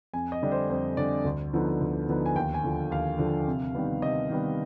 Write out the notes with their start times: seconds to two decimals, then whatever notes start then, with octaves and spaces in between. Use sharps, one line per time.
0.13 F2 G#5
0.32 D#5
0.42 D3 G3 D4
0.52 C5
0.69 F2 C5
0.97 D3 G3 D4 D5
1.25 D2
1.53 D3 F3 B3 D#4
1.81 D2
2.09 D3 F3 B3 D#4
2.26 G#5
2.35 D#2 G5
2.54 G#5
2.63 D3 F3
2.91 D#2 F5
3.19 D3 F3
3.47 C3
3.75 D#3 G3 B3
4.02 C3 D#5
4.30 D#3 G3 B3